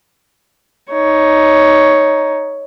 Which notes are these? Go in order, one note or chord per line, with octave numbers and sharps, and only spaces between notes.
D#4 C#5